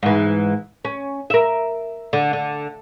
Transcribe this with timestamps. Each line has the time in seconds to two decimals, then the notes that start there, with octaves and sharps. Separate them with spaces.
0.03 G#2 E3
0.85 C#4
1.30 A#4 E5
2.13 D3
2.33 D3